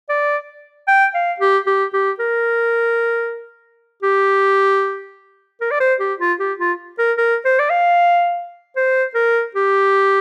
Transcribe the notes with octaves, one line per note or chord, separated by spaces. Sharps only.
D5
G5
F5
G4
G4
G4
A#4
G4
A#4
D5
C5
G4
F4
G4
F4
A#4
A#4
C5
D5
F5
C5
A#4
G4